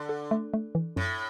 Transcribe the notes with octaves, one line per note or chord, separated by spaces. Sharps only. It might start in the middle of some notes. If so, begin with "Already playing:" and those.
Already playing: D3
A4
A3
A3
E3
F#2 A2